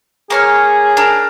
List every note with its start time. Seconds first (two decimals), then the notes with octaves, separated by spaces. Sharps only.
0.30 A#3 G#4 C#5 F6
0.97 D4 A#4